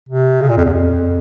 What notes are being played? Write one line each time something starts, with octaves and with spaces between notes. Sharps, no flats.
C3
C#3
A#2
F2
E2
F2